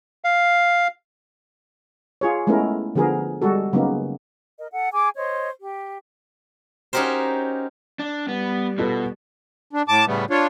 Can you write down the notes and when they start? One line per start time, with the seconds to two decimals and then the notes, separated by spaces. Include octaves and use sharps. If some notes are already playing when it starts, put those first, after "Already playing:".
0.24 F5
2.21 F4 G#4 C#5
2.47 G#3 A3 B3 C#4 E4 A#4
2.95 D3 F3 B3 G#4 A#4
3.42 G3 G#3 F#4 A4
3.73 C#3 F#3 A#3 B3 D#4
4.57 A#4 D#5
4.71 A4 F#5
4.92 G#4 G#5 D6
5.16 C5 C#5 D#5
5.60 G4
6.93 C#4 D#4 F#4 G4 A#4 C5
7.99 D4
8.28 G3 B3
8.78 B2 F4 A4 B4
9.73 D4
9.88 A2 A5 D6
10.07 A2 C#3 G3 A3 B3
10.30 D4 F4 C#5